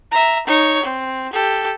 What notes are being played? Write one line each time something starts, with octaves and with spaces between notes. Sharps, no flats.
E5 A#5
D#4 C#5
C4
G4 A4